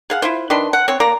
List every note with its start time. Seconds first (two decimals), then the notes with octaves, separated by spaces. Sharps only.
0.10 G#4 F5 F#5
0.22 E4 F4 C5
0.50 D#3 D4 B4 C6
0.73 F#5
0.88 C4 C#5
1.00 A#3 D5 A#5